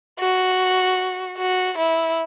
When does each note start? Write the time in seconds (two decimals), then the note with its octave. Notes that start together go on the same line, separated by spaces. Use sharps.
0.19 F#4
1.38 F#4
1.78 E4